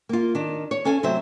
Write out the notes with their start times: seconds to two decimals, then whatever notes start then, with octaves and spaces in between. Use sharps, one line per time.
0.09 A#3 F4
0.35 D#3 D4
0.71 C#5
0.85 C#4 A4 F5 G#5
1.03 C3 F#3 A3 C5 E5